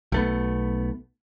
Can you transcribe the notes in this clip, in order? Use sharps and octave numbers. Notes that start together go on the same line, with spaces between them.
B1 A3 B3